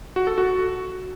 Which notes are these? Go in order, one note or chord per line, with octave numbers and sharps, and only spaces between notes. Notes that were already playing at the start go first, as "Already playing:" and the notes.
F#4
A4
F#4